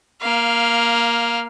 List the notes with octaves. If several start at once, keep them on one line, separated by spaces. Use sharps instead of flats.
A#3 F5